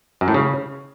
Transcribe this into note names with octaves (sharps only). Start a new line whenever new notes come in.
F#2
A2
C#3